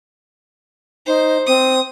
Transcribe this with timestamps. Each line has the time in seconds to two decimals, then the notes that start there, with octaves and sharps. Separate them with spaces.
1.07 D#4 C5
1.47 C4 D#6